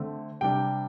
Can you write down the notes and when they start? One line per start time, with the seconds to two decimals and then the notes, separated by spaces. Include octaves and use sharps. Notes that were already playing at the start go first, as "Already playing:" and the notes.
Already playing: D3 A3 C4
0.41 C3 G3 D4 G5